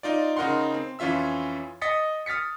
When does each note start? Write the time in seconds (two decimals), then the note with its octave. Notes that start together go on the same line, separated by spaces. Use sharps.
0.03 D#4 F4 D5
0.37 C#3 D#4 A#4 F#5 C6
0.74 C4
0.99 F2 E3 C#4 F4 E5 E6
1.82 D#5 D#6 A6 B6 C#7
2.26 D#6 F6 A6 B6 C#7